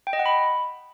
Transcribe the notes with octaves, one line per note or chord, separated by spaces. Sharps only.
G5
D#5
F#5
B5